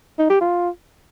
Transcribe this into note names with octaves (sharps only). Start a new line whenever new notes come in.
D#4
G4
F4